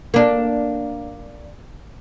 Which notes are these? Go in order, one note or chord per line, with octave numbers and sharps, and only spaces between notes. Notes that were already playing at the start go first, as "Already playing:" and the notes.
A#3 D4